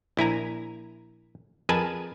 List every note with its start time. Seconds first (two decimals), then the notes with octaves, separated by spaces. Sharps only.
0.17 A#1 E4 G#5 A#5
1.69 F2 G#4 A#4 B4 G#5 A5